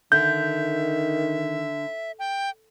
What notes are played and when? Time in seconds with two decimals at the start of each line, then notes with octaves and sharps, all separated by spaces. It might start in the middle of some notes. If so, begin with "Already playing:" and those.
0.12 D3 D#3 E5 G6
2.19 G5